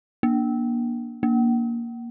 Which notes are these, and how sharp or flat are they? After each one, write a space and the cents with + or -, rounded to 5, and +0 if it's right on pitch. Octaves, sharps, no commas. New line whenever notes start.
A#3 +30
A#3 +10